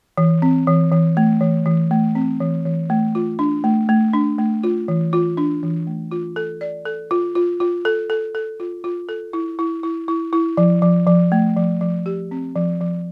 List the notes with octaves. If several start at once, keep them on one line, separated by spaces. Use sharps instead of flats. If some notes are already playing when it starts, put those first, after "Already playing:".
E3
C4
E3
E3
A3
E3
E3
A3
C4
E3
E3
A3
F4
D4
A3
A3
D4
A3
F4
E3
F4
D4
E3
A3
F4
A4
D5
A4
F4
F4
F4
A4
A4
A4
F4
F4
A4
E4
E4
E4
E4
E4
F3
F3
F3
A3
F3
F3
G4
C4
F3
F3